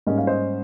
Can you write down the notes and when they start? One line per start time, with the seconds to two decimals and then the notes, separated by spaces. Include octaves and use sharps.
0.07 G#2 G3 A#3 C#4 D#5
0.18 F5
0.27 C5 D#5